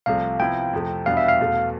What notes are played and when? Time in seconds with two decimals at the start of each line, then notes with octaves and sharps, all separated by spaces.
0.06 C2 C3 F3 A3 F5
0.40 C3 F3 B3 E4 G5
0.73 F2 C3 F3 A3
1.06 E2 B2 G3 B3 D4 F5
1.17 E5
1.28 F5
1.39 E2 B2 A3